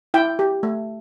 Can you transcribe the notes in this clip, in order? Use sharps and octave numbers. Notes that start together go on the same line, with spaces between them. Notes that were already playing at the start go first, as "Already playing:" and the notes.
E4 G5
G4
A3